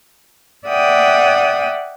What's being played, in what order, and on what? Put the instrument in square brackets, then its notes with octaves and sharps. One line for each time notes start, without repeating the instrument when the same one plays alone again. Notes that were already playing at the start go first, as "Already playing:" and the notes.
[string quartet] D5 E5 F#5 G5 D#6